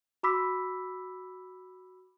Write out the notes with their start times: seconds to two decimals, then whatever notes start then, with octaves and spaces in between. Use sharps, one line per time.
0.23 F#4 B5 D6 E6 B6